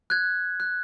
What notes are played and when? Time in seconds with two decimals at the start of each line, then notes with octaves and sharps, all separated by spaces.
0.10 F#6 G#6
0.60 F#6